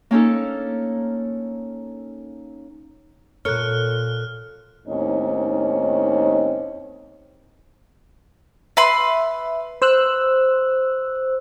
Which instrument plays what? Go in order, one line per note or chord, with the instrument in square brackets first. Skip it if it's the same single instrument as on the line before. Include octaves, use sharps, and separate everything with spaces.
[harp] A#3 C#4 D#4 A4
[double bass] A#2 [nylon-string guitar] A4 A#4 C#5 [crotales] F6 F#6
[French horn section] D#2 A2 C4 C#4 D#4
[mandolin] B4 B5 C6 [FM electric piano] E5
[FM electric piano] C5 E6 F#6